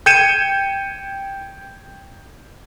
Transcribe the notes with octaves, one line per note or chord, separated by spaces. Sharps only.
G5 G6 G#6 C#7 D#7 E7